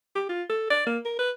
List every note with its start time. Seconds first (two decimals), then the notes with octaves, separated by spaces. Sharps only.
0.16 G4
0.29 F4
0.50 A4
0.71 D5
0.87 A#3
1.05 A#4
1.19 B4